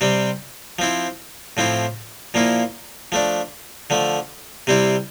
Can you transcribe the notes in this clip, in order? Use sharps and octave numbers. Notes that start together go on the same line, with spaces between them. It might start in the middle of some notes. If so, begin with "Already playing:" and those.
C3 G3 C4
F3 C4 E4
A2 F3 C4 E4
A#2 F3 A#3 E4
F3 A3 D4
D3 F3 A3
C3 G3 C4 E4